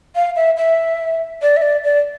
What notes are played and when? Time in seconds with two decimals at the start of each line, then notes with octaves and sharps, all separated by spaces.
0.15 F5
0.36 E5
0.57 E5
1.42 D5
1.57 E5
1.62 D5
1.84 D5